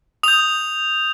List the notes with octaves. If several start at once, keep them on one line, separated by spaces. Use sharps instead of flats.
D#6 G6 F7